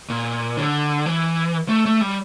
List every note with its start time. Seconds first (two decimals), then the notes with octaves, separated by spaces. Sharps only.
0.10 A#2
0.57 D3
1.06 E3
1.69 A3
1.86 A3
2.01 G3